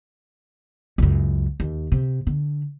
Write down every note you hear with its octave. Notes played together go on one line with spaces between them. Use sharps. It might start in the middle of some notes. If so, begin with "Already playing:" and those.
C#2 F#2
D#2
C3
D3